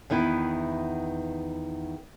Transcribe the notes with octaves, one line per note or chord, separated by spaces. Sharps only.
E2 D#3 B3 E4